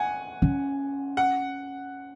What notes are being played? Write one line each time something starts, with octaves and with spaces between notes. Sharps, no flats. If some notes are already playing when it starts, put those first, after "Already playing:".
Already playing: F#5 G#5
C#4
F#5